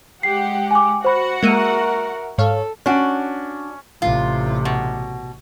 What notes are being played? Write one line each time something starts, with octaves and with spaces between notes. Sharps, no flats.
G#3 G4 F#5 C7
G#5 D6
F#4 C5 F#5 B5
G#3 A#3 A#4 E5 E6 C#7 D#7
G#2 A4 C#5 F5
C#4 D4 F#4
A1 C3 F4
B2